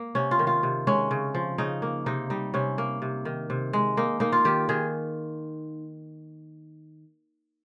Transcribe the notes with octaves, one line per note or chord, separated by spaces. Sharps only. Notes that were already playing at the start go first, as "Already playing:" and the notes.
Already playing: A#3
C3 C#4
F4
D#3
F4
C3
G#3 C#4
C#3
F3
C#3 D#4
A#3
C3 D#4
G3 D#4
C3 C#4
A#3
C3
D#3
C3
G#3
A#3 D#4
A#3 D#4
F4
D#3 G4
D#3 G#4